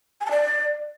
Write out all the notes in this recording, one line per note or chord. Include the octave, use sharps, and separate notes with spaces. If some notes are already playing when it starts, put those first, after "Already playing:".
G#5
A5
D5